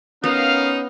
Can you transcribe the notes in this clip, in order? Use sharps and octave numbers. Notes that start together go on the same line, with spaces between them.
B3 C#4 D#4 A#4 F5